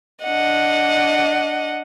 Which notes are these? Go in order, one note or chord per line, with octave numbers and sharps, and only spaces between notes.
D4 D#5 F#5